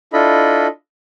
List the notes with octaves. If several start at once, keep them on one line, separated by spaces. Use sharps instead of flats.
D4 E4 F4 A4 D#5 B5